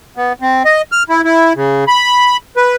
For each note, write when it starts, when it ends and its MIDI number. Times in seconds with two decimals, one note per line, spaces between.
0.17 0.33 59
0.42 0.63 60
0.65 0.82 75
0.92 1.03 89
1.09 1.21 64
1.24 1.53 64
1.56 1.84 49
1.88 2.37 83
2.57 2.76 71